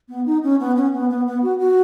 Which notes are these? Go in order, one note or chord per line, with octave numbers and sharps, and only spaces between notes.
B3
D#4
C#4
B3
C#4
B3
B3
B3
F#4
F#4